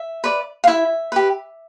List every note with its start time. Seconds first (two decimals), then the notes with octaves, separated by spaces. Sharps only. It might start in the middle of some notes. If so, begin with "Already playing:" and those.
Already playing: E5
0.24 B4 D5
0.64 F5
0.67 E4 E5
1.12 G4 B4